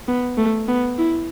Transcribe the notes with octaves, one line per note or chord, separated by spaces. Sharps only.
B3
A3
B3
E4